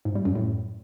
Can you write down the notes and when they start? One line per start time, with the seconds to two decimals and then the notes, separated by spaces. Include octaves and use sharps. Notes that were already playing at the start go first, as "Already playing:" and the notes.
0.05 G#2
0.15 G3
0.25 F#2
0.35 A2